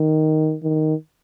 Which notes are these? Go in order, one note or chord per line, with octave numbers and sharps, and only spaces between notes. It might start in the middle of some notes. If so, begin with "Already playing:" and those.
Already playing: D#3
D#3